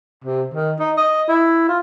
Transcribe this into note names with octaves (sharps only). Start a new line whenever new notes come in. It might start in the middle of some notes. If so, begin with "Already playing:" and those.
C3
D#3
D#4
D#5
E4
F4